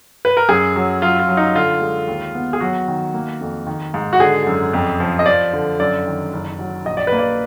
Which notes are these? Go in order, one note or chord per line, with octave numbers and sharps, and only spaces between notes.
B4
A#4
F#2 G#4
F#3
F#3 F4
F4
F#3
D#4
D3 F4
G#3
D#2
B3
G#4
F#3 F#4
D#3
A#3
F2
D#3
G#2
F#4
D3 G#4
F#2
F2
F3
D#5
F3 D5
D3
F#2 D5
D#3
F#1
F#3
A#1 D#5
D5
B4
A#3
D5